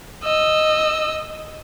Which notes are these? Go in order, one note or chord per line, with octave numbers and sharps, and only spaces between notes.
D#5 E6